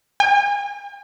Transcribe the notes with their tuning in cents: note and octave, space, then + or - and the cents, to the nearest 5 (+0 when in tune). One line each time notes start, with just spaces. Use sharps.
G#5 -45